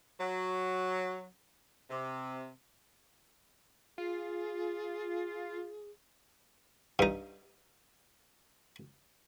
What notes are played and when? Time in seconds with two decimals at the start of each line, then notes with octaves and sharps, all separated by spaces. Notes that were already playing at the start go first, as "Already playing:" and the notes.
0.21 F#3
1.90 C3
3.98 F4 G#4
6.99 G2 D#4